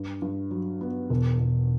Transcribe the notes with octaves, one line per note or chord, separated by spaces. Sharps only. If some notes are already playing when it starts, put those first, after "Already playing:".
Already playing: G2
G2
F#3
B3
E1
E1